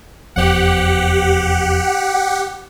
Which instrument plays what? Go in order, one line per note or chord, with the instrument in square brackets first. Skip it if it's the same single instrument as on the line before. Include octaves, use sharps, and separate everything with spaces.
[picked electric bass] F1 E2 F3 [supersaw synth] G4 F#5